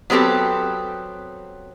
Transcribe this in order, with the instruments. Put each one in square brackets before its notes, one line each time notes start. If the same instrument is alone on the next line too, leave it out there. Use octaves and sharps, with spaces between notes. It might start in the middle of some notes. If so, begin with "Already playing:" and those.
[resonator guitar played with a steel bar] F#3 B3 C4 G4 A4